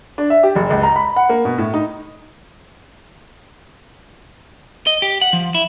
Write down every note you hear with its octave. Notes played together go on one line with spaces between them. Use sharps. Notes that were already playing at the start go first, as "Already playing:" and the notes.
D4
E5
G4
F#1
C#2
A#5
B5
F#5
A#3
B2
A2
D#4
D#5
G4
F#5
F3
E4